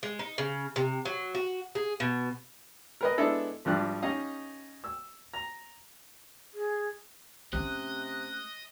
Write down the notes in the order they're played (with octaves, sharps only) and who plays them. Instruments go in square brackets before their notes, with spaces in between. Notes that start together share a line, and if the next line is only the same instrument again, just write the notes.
[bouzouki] G#3
D#4
C#3
C3
F#3
F#4
G#4
B2
[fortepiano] A#4 B4 D#5
G#3 B3 D4 E4 A4
G#1 F3 G3 D4 F#6
C#4 D#4 G4 D#5 F5
E6
A#5
[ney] G#4
[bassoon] C3 [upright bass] A3 C#4 [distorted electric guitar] D#5 [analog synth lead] F#6